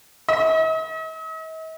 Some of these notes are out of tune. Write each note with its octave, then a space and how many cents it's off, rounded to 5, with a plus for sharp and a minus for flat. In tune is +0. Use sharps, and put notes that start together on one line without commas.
D#5 +45